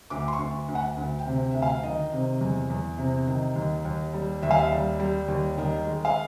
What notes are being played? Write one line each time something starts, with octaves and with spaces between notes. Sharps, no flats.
D2 D6
C6
C#6
D2
D2
F#5
D2
G5
C3
D2 E5
F5
D#3 D#5
C3
E2
E2
C3
D#3
D#2
D#2
G3
D#2 E5
F5
E5
G3
G3
D#2
D#3
G#3
F5